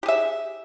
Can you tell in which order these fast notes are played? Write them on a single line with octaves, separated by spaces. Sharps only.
G4 G#4 E5